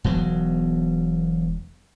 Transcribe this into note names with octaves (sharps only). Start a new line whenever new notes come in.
E1 B2 F#3